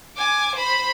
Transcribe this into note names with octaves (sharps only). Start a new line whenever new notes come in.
G#5 D6
C5 B5